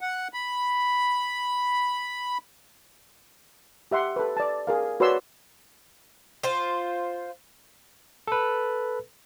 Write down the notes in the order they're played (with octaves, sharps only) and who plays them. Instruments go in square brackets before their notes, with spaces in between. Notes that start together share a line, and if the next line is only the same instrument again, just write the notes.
[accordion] F#5
B5
[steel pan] G4 E5 F#5 C6
A4 B4
D5 A5
G#4 A#4 F5
F#4 B4 C#5 D5 C6 E6
[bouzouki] F4 C5
[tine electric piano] A4 B4